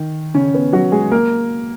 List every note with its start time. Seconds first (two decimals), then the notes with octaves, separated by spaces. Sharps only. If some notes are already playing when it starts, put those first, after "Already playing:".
Already playing: D#3
0.34 C#3 C#4
0.54 B3
0.73 F#3 F#4
0.92 G#3 G#4
1.12 A#3 A#4